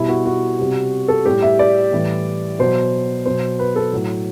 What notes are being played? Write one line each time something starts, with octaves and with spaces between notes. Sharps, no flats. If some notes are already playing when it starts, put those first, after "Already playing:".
Already playing: B2 G3 E4
F#4
F#4
C3 G3
A4
A2 G3 G4
E5
D5
A2 E3 G3
B2 F#3 C5
B2 F#3 C5
B4
A4
A2 F#3